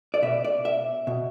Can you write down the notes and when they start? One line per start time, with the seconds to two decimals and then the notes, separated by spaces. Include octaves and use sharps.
0.14 D5
0.23 B2 E5
0.44 D5
0.65 E5
1.07 B2